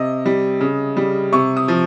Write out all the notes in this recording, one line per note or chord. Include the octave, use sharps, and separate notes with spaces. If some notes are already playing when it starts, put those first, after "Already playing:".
Already playing: C3 D#5
G3
C#3
G3
C3 C#6
D#6
F3